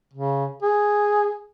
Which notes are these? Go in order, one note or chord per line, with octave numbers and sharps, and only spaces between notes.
C#3
G#4